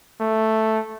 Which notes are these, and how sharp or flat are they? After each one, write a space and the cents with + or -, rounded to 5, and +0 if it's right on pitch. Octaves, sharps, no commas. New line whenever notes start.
A3 +0